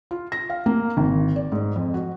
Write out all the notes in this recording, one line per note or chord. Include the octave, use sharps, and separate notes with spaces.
F4
A#6
F5
A#3
G#1
D5
G#2
F2
F#4